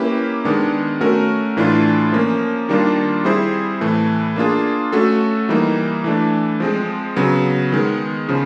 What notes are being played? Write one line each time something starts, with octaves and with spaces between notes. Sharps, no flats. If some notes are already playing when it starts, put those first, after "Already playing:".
Already playing: A#3 C#4 E4 G4 B4
D#3 G#3 B3 D4
A3 C#4 F#4 A#4
A2 E3 A3 D4 F4
F3 A#3 C#4
D#3 G3 A#3 D4 F4
G3 C4 E4 G#4 C5
A2 E3 A3
A#3 D4 F4 G#4
A3 C#4 F#4 A4
E3 G3 A#3 D#4
E3 A3 D4
F3 G#3 C4
C#3 F#3 B3
D#3 G#3 B3
C#3 F3